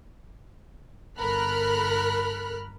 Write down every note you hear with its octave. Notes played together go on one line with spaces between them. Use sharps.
G1 A4 A#4 B5 F6 F#6